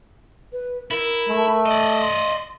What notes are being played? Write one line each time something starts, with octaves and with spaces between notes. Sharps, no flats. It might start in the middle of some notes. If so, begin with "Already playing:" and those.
B4
E4 A#4
A3
D5 D#5
C6